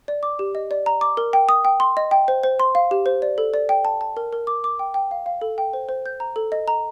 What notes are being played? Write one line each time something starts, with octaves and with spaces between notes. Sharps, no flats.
D5
D6
G4
D#5
D5
A#5
D6
A#4
G5
D#6
G5
C6
D#5
G5
C5
C5
C6
F5
G4
C5
D5
A4
D5
G5
A5
A5
A#4
A#4
D6
D6
G5
G5
F5
F5
A4
G5
C5
C5
G6
A#5
A4
D#5
A#5